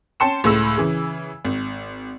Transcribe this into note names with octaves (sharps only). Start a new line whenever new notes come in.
C#4 G5 A5 C6 C#7 E7
C#2 A2 E6
C#3 E3
G#1